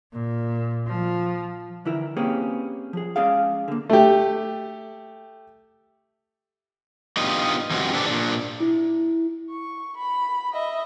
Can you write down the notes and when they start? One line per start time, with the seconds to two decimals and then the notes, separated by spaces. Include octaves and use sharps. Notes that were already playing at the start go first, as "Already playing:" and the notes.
0.12 A#2
0.86 F3
1.85 D3 E3 E4 A#4
2.17 A#3 C4 C#4 G4 G#4 B4
2.93 F3 G#4
3.16 G#3 C#4 G#4 D5 F5
3.68 D3 A#3
3.89 A3 G4
7.17 B3 D4 D#4 F4 G4 D#5
7.71 E3 F3 G#3 C4 F#4 G4
7.94 D4 G4 A4 B4 D5
8.06 A#2 D#3 D4
8.60 E4
9.50 C#6
9.97 B5
10.53 D#5 E5